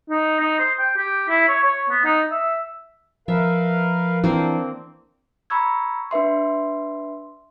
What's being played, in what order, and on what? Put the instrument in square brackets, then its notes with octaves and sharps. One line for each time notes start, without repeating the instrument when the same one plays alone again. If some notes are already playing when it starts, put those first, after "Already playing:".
[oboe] D#4
D#4
C5
G5
G4
E4
C#5
C#5
B3
D#4
E5
[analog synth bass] F3 [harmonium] A#4 B4 F5 [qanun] E5
[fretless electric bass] E3 [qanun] A#3 C4 C5 [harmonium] D4
[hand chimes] A#5 B5 C#6 E6 G#6
D4 B4 E5 C6